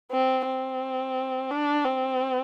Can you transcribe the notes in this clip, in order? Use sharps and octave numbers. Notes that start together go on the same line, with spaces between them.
C4
C4
D4
C4